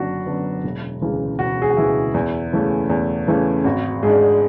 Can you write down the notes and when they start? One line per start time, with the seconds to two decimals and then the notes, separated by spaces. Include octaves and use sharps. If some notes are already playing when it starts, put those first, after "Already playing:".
Already playing: F#1 D3 F#3 B3 D4 F#4
0.26 F#2 D3 F#3 B3
0.64 E1
1.01 D2 C#3 E3 G#3
1.39 E1 F#4
1.62 G#4
1.70 F#4
1.77 D2 C#3 E3 G#3 E4
2.14 E2
2.52 C#3 E3 A3 C#4
2.90 E2
3.27 C#3 E3 A3 C#4
3.64 G#1 F#4
4.03 G#2 G#3 D4 G#4